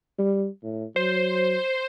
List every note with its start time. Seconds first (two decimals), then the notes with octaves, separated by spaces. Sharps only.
0.18 G3
0.63 A2
0.96 F#3 C5